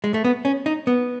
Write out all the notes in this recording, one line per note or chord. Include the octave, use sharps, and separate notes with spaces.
G#3
A3
B3
C#4
D#4
B3